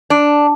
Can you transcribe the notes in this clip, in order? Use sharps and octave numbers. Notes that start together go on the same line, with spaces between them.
D4